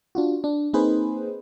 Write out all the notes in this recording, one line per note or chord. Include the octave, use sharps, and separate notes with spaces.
D4 F4 F#4
D4
A#3 C4 D#4 G#4 B4 C5